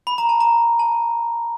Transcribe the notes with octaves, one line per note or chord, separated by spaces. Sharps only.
B5
A#5
A5
A#5
A5